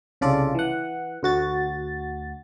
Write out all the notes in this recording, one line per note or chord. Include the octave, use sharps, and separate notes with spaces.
C2 C#3 F4 A4 D5
E3 F#5
D2 F#4 A6